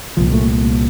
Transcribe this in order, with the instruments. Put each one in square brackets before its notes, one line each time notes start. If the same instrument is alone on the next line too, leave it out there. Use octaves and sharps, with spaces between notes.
[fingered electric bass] C2 A#2 F3
A3